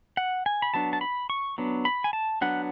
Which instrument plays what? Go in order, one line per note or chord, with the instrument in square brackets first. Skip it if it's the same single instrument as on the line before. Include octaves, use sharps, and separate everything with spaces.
[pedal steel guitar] F#5
G#5
B5
F#3 B3 D4 A5
A5
B5
C#6
F#3 B3 D4
B5
G#5
A5
F#3 B3 D4 F#5